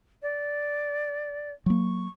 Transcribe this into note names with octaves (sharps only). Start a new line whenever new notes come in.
D5
F#3 A#3 C#6